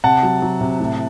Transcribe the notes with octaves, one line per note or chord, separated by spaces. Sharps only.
C3 F#5 A5
F#3
F#3
C3
A2